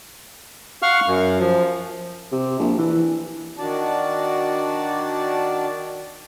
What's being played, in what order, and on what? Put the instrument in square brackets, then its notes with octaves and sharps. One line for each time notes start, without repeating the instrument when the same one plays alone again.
[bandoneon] F5 F#5 C#6 F6
F#2
F3
[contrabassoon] C3
A#1
E3
[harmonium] D#3 D4 F#4 D5 A5